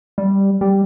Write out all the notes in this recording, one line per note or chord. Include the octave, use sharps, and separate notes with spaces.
G3
G3